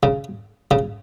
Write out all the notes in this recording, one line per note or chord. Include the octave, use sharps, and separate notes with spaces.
C#3
C#3